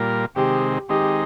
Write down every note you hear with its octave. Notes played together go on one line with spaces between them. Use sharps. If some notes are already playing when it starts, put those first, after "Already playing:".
Already playing: A#2 G3 F4 A#4
C3 D#3 G#3 C4 G4
D#3 G#3 C4 D#4 G4